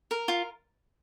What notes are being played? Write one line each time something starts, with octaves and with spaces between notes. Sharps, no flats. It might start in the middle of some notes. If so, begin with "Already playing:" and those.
A#4
F4